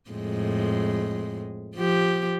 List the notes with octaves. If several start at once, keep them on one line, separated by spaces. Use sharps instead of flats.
F2 A2 G#3
F3 G4